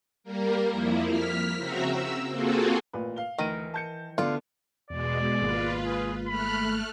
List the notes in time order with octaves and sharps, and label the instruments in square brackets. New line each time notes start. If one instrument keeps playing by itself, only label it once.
[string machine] G3 A#3 A#4
F2 F3 A#3 E4
F6 B6
C#3 C4 F#4 E5 A#5
E6
A#3 C4 F4 F#4 G#4 A4
[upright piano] A1 A#2 B4
F5 G7
[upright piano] D2 D#7 [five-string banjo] D#3 A#4 [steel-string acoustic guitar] E3
[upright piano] A5 G6 C#7
[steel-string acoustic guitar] D3 A3 B3 [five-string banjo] F4 [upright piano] D5
[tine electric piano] E2 [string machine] B2 G#3 [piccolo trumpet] D5
[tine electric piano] G#1 G#3 A#3 [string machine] F4 B4
[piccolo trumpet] G#4
[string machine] A3 F6 F#6 [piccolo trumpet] B5